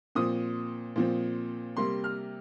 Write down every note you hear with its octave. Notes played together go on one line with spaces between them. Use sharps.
A#2 F3 C4 D#6
A#2 F3 C4
C3 G3 A#3 C6
F6